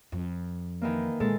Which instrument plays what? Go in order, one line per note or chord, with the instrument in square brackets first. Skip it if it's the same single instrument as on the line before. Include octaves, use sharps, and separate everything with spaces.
[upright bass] F2
[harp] D#3 E3 A#3
[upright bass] A#2 [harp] G#3 A4